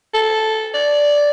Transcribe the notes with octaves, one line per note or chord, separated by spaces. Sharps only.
A4
D5